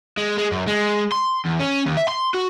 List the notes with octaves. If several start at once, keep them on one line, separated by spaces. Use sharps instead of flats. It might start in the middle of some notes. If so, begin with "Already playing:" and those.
G#3
G#3
F#2
G#3
C6
E2
C#4
D#2
E5
C6
F#4